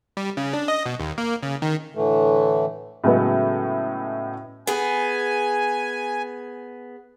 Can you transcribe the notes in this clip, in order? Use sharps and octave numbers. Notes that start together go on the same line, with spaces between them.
G3
C#3
D4
D#5
B2
D#2
A#3
C#3
D#3
A2 D3 E3 A3
A2 C#3 F#3 G#3 B3
B3 G#4 G#5